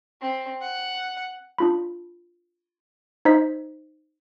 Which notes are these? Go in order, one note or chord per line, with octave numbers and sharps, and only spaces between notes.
C4
F#5
D4 F4 B5
D#4 C5 D#5 B6